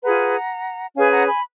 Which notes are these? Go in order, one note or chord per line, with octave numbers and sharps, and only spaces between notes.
F4 G#4 B4 F#5 A#5
C#4 G#4 B4 F5 G#5
F#5 A#5
G#5 B5